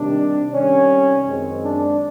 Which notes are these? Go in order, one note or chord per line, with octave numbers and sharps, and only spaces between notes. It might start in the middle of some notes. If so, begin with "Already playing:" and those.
Already playing: C3 D#3 G3 D4
C3 D#3 G3 C#4
F#2 D#3 G#3 C4
D4